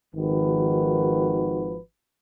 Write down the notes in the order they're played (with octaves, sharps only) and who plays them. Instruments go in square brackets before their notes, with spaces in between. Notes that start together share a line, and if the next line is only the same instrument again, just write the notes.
[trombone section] G#1 D#3 F3 F#4 B4